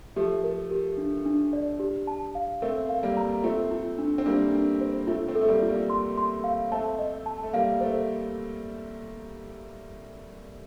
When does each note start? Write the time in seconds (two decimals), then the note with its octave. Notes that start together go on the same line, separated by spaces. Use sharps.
0.16 F3 A3 G4
0.44 A#4
0.71 G4
0.98 D4
1.25 D4
1.53 D5
1.79 G4
2.07 A5
2.35 F5
2.62 A3 C4 A#4
2.89 F5
3.03 G3 A#3
3.17 A#5
3.44 A3 C4 F4
3.71 F4
3.98 D4
4.18 C4
4.26 G3 A#3 D4
4.54 D4
4.81 C5
5.07 A3 C4 F4
5.28 A3 C4
5.35 A4
5.41 A3
5.49 G3 A#3
5.62 F4
5.69 G3 A#3
5.90 C6
6.18 C6
6.44 F5
6.72 A3 C4 A5
6.99 D#5
7.26 A5
7.43 A3
7.53 G3 A#3 F5
7.81 A3 C5